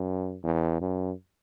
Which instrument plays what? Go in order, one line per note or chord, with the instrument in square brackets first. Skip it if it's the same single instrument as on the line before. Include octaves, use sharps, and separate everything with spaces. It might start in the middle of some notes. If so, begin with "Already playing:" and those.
Already playing: [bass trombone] F#2
E2
F#2